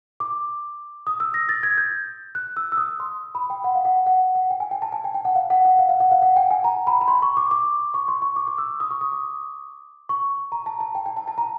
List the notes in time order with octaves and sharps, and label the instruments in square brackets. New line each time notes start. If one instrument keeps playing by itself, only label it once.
[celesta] D6
D#6
E6
A#6
A6
G#6
G6
F#6
E6
E6
D#6
C6
B5
G5
F#5
F5
F#5
F#5
F#5
G5
G#5
G5
A5
G#5
G5
G5
F#5
F5
F#5
F#5
F5
F5
F#5
F5
F#5
G5
G#5
A#5
B5
B5
C6
C#6
D6
D6
C#6
C6
C#6
D6
D6
E6
D#6
C#6
D#6
D6
C#6
A#5
A5
A5
G5
G5
A5
A5
A#5